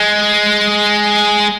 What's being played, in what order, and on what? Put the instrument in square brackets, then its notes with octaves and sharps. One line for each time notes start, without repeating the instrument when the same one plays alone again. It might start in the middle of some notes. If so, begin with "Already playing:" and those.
Already playing: [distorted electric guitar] G#3